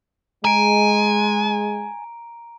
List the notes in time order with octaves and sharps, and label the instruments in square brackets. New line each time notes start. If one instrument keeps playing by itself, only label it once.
[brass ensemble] G#3 [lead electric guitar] G#5 [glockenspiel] A#5 D7